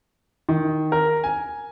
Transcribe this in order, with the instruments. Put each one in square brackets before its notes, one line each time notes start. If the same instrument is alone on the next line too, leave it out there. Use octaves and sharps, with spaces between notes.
[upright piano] D#3
A#4
G#5